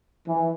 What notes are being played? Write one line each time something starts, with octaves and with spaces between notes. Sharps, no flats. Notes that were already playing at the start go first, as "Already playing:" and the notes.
E3